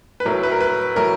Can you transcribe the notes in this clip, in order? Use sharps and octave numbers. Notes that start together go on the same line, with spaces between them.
B4
A2 F#3 A#4
B4
A#4
B4
A2 F#3 A#4